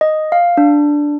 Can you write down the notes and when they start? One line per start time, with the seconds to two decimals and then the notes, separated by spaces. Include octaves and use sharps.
0.01 D#5
0.32 F5
0.57 D4